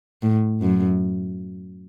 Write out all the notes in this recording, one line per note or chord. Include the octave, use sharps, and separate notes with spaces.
A2
F#2